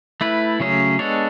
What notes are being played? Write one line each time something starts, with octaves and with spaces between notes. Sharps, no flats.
A3 E4 B4
C#3 F#3 A3 C#4 G#4
G#3 B3 D4 A4 C#5